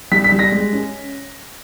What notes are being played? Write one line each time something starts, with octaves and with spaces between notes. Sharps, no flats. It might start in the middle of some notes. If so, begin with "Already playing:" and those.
G3 B6
B6
G3
A#6
G#3
C#4